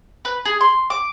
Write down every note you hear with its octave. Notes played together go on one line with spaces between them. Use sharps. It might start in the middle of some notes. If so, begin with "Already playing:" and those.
B4
G#4
C6
D6